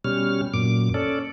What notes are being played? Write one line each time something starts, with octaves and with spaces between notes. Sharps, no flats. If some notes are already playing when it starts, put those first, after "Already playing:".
B2 G3 C#4 F6
F#2 A#2 D6
C#4 A4 D5